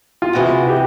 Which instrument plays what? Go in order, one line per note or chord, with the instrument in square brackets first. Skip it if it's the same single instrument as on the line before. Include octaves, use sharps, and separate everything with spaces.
[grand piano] F4
[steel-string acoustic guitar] D2 C3 E3 G#3 [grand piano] F#4
[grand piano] G4